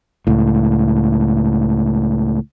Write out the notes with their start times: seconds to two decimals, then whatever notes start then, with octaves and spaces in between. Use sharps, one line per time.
0.27 C#2 A2